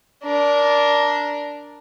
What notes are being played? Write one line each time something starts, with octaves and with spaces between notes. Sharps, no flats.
D4 A#4